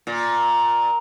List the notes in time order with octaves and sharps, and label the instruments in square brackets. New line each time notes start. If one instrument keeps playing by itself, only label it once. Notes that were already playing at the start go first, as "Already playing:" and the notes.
[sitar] A#2